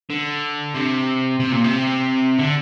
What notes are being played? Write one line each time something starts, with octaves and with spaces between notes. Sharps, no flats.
D3
C3
C3
A#2
C3
D3